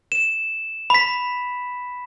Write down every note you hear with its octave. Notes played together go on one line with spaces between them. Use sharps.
E7
B5 B6